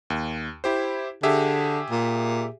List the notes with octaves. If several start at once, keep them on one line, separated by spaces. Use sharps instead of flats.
D#2
E4 G4 C5
D3 G4 G#4 E5
A#2